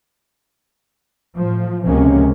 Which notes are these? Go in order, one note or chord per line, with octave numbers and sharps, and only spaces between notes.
A2 F3
C#2 C3 F3 G#3 A#3 C#4